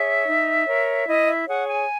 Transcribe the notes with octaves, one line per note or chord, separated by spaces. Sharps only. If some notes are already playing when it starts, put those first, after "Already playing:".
Already playing: G#4 C#5 E5
D#4
A#4 C#5
E4 D#5
E5
G#4 C#5 F#5
G#5